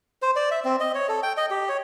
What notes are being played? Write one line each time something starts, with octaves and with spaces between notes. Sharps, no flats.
C5
D5
E5
C4
D#5
C#5
A4
G5
D#5
G4
C#5